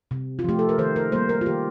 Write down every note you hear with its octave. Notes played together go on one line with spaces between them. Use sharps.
C3
F4
F3 A3 G4
A4
A#4
D#3 C5
A#4
G3 A#3 C5
A#4
F4
D#3 G4